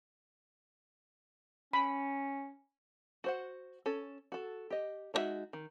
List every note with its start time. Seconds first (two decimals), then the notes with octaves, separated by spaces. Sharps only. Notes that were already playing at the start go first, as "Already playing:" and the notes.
1.73 C#4 B5
3.24 F#4 C5 F#5
3.86 C#4 A4
4.32 F#4 A4
4.70 G4 D#5
5.14 G#3 D4 D#4 F#4 E5
5.53 D#3